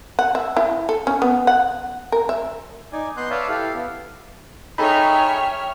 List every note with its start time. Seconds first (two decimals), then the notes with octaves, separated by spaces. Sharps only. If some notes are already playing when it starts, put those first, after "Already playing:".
0.19 F#5
0.35 E5
0.57 E4
0.89 A4
1.07 C#4
1.22 B3
1.47 F#5
2.12 A#4
2.29 E5
2.93 D#4 D5 G#5
3.17 B3 D#5 C6 F#6 G6
3.30 B4 C#5 D5 E5 F5 A5
3.49 E4 G4 A4 F5
3.75 B3
4.78 D#4 G#4 A4 C#5 E5 G5 B5 F6